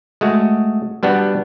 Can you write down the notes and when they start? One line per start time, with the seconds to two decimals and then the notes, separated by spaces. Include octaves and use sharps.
0.21 G#3 A3 F#4
1.03 G3 B3 D4 F#4